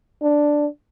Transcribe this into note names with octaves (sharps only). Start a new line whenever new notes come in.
D4